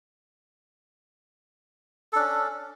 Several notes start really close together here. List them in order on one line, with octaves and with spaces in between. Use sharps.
A4 D4 C#4